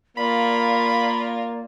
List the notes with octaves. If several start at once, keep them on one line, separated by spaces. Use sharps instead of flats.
A#3 F4 A#4 D5 B5